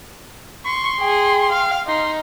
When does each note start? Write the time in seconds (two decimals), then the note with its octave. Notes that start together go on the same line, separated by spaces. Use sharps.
0.66 C6 C#6
1.00 G#4 G5
1.52 F5
1.87 D#4 C6